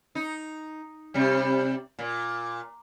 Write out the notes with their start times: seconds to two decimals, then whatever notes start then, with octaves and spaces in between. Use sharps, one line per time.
0.15 D#4
1.14 C3 G3
1.99 A#2